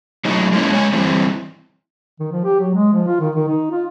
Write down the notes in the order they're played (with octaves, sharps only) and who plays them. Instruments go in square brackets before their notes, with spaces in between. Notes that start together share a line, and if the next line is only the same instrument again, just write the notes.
[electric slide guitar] F#3 A3 D#4 E4
G#3 A#3 C#4 D#4 E4
G#3 C#5 G#5
D3 E3 G3 C4 E4 C5
[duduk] D#3
F3
G4
F#3
G#3
F3
F4
D#3
D#3
D#4
F4